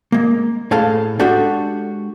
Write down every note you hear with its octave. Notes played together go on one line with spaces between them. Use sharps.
G#3 A#3
A2 G#4 A4 F5 A5
G#3 D4 F#4 G4 A4